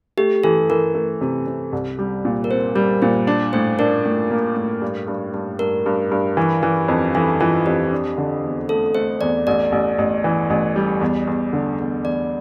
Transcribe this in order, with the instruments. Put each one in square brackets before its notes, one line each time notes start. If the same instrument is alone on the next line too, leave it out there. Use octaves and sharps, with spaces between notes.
[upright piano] A3 [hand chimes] G4
[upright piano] E3 [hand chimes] A4
[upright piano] E3 [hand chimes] A#4
[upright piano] A3
C3
C3
C2
G3
A#2
[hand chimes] A#4
[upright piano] C4 [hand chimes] C5
[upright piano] G3 [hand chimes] A#4
[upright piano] A#2 [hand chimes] C5
[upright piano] D4 [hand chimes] D5
[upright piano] A2 [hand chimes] C5
[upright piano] D4 [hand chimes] A#4
[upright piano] A2
A#3
A2
G2
G2
G2
[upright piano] G2 [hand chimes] A#4
[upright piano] G2
G2
E3
E3
F2
[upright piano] E3 [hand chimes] A4
[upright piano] E3 [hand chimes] F4
[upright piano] F2 [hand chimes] G4
[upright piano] D4
D3
E2
[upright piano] A3 [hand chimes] A4
[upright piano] A3 [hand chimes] C5
[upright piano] E2 [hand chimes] D5
[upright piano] A1 [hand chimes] D5
[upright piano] A1
A1
E3
A1
G3
E2
E2
D3
E2
[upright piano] E2 [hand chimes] D5